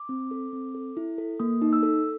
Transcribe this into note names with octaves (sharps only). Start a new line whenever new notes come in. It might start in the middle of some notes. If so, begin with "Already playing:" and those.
Already playing: D6
C4
A4
C4
A4
E4
A4
A#3 D#6
D#4
E6
A4